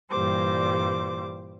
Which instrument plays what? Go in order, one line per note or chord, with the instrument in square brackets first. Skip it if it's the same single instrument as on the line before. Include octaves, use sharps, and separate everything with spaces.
[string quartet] G2 A#2 E3 G3 C5 D6